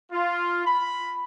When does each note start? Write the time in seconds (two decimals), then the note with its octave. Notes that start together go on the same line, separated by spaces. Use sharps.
0.12 F4
0.66 B5